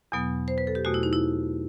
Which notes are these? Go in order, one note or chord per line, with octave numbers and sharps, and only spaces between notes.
E2 B2 F#3 B3
C5
B4
A4
G4
E2 B2 A3 F#4
E4
D#4
E4